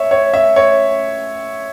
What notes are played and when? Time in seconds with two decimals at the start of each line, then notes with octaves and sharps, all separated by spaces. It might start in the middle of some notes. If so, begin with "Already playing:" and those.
Already playing: C#5 E5
0.11 C#5
0.34 E5
0.56 C#5